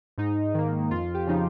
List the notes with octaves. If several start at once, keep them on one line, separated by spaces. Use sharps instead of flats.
G#2 D#4
D#3 A#3
F2 F4
G4
C#3 F3 D#4